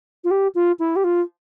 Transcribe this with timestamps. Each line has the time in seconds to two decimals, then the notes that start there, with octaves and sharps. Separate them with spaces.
0.24 F4
0.30 G4
0.54 F4
0.79 E4
0.95 G4
1.03 F4